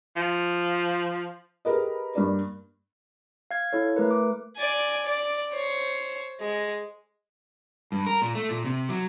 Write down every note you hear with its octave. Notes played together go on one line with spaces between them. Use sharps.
F3
G4 G#4 A#4 B4 D#5
G2 A#3 D5
F5 G#6
E4 A4 C#5
A3 A#4 B4
D6
D5 G#5
D5
C5 C#5
G#3
G2
A#4
A#2
A3
A#2
C3
F#3